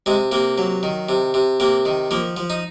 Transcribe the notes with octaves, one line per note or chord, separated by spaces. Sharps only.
C3 G#3
C3 A#3
F#3
D#3
C3
C3
C3 A#3
D#3
F3 A#3
F3
D#4